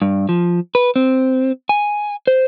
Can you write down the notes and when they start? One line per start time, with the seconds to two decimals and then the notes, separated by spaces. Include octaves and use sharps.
0.02 G2
0.29 F3
0.75 B4
0.96 C4
1.69 G#5
2.27 C5